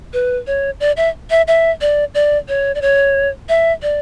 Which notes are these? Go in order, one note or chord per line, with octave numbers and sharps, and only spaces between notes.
B4
C#5
D5
E5
E5
E5
D5
D5
C#5
D5
C#5
E5
D5